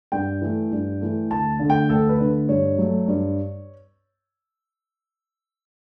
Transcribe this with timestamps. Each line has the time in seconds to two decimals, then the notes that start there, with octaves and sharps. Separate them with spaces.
0.12 G2 G5
0.41 E3 A3
0.72 G2
1.01 E3 A3
1.31 D2 A5
1.59 D3 A3
1.70 G5
1.89 D2 A4
2.09 B4
2.20 D3 A3
2.49 G2 C#5
2.78 F#3 A3
3.08 G2